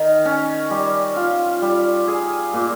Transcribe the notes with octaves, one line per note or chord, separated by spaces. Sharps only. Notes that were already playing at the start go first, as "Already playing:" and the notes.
Already playing: D#3
C#4
G3
F4
G3
G#4
A#2